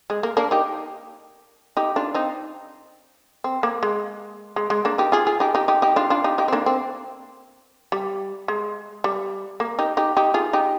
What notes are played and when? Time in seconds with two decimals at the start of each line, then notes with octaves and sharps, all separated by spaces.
0.10 G#3
0.23 A#3
0.37 A#3 D4
0.51 D#4 G4
1.77 D#4 G4
1.96 D4 F4
2.14 C4 D#4
3.44 C4
3.63 A#3
3.83 G#3
4.56 G#3
4.70 G#3
4.85 A#3 D4
4.98 D#4 G4
5.12 F4 G#4
5.27 F4 G#4
5.40 D#4 G4
5.55 D#4 G4
5.68 D#4 G4
5.82 D#4 G4
5.96 D4 F4
6.10 D4 F4
6.24 D#4 G4
6.38 D#4 G4
6.48 C4
6.52 A#3 D4
6.66 C4
7.92 G3
8.48 G#3
9.04 G3
9.60 A#3
9.79 D#4 G4
9.97 D#4 G4
10.17 D#4 G4
10.34 F4 G#4
10.53 D#4 G4